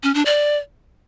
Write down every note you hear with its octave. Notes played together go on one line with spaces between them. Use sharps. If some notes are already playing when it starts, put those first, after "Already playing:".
C#4
D4
D5